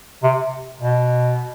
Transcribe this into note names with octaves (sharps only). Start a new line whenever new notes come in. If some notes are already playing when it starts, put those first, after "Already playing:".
C3
B2